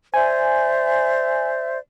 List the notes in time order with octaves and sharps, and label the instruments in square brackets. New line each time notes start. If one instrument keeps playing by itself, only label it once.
[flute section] C5 D5 E5 [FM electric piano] G#5